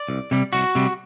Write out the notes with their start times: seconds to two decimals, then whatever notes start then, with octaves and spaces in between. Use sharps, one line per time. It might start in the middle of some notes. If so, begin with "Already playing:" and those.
Already playing: D5
0.09 C2
0.31 C3 G3
0.53 C2 F#4
0.75 C3 G3